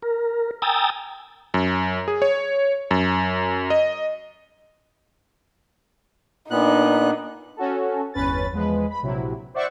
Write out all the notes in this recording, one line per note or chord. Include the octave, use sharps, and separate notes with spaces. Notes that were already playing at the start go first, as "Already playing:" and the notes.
A#4
G5 G#5 A#5 D#6 E6 A6
F#2
G#4
C#5
F#2
D#5
A#2 B3 D4 D#4 F#6
C#4 F#4 A4
G1 E2 C#4 B4 A6
E2 F3 G#3 B4
B5
A#1 C3 F#3 E4
C5 D5 E5 F#5 C#6